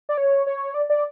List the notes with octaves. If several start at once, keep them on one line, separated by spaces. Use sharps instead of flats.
D5
C#5
C#5
D5
D5